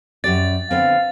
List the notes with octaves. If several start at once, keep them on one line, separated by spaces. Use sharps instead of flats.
F#2 G4 D5 A6
D3 B3 C4 F5